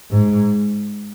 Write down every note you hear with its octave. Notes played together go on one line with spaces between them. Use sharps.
G#2